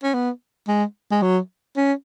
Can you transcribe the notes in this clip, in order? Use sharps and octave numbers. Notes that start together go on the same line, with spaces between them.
C#4
B3
G#3
G#3
F#3
C#4